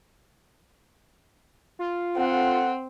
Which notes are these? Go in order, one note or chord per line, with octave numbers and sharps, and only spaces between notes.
F4
C4 A4 F#5